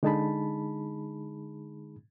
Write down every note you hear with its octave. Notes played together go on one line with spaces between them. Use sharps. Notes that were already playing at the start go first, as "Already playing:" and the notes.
D3 G#3 D#4 G#4 A5 B5